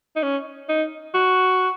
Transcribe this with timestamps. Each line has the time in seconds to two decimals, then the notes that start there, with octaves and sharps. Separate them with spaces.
0.16 D#4
0.23 C#4
0.69 D#4
1.14 F#4